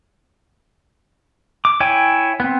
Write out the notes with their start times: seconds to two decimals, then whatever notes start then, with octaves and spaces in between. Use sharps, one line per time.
1.65 D6
1.80 E4 C#5 G5 G#5
2.40 B3 C4